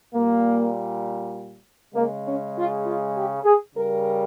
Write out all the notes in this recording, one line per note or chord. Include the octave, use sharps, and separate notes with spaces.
A#2 G3 A#3
C#3 G#3 A#3
C#4
F4
F4
G4
G#4
C#3 G3 A#4